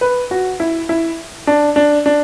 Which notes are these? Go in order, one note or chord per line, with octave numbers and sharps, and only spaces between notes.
B4
F#4
E4
E4
D4
D4
D4